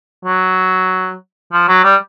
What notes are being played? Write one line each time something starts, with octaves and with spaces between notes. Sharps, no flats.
F#3
F3
F#3
G3